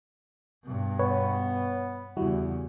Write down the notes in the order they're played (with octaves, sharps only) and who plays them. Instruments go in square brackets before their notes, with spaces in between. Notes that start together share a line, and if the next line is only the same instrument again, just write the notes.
[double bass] G2 B2
[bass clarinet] B3 [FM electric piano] B4 C#5
[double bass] E2 C#3 [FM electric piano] G3 E4 F#4